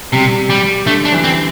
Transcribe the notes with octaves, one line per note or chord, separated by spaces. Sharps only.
C3 G3
G3
D3 A3
D4
E3
C4